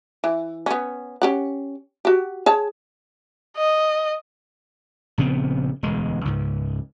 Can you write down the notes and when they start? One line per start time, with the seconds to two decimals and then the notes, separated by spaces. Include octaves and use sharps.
0.24 E3
0.66 B3 C#4
1.22 C#4 G4 F#5
2.05 F#4 G4
2.46 G#4 C#5 A5
3.57 D#5
5.18 A#1 C#3 B3 C4
5.83 E1 D2 G#3
6.25 C#2 G#2